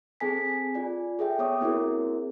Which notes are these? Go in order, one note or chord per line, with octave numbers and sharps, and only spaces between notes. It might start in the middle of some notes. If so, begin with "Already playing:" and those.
C4 G#4 A4 G#5 A5 B6
F4 D5 G#5
G#4 A4 E5 G5
B3 C#5 D6 D#6
A#3 C4 E4 F#4 G#4 A#4